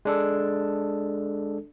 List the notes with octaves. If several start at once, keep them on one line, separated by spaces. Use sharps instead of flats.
G#3 D4 A4